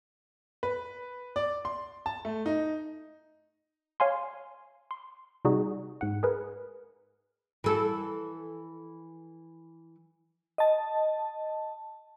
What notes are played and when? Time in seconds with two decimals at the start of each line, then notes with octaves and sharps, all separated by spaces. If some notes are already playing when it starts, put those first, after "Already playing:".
0.63 B4
1.36 D5
1.65 C6
2.06 A5
2.25 A3
2.46 D#4
4.00 C#5 F5 G#5 C6
4.91 C6
5.45 C3 G3 D#4 F#4 G#4
6.01 G#2 F#5
6.23 G#4 A#4 B4
7.64 E3 A4
10.58 D#5 A5